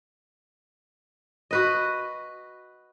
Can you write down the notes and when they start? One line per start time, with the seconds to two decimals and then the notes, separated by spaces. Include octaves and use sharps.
1.51 F#4 B4 D#5